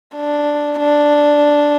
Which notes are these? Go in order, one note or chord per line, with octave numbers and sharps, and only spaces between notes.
D4
D4